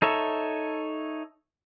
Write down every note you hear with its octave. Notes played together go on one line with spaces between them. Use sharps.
D#4 A4 C#5 E5